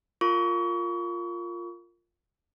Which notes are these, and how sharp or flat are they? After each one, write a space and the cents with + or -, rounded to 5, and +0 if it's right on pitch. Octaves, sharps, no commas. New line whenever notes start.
F4 +0 A#4 -15 C#6 +35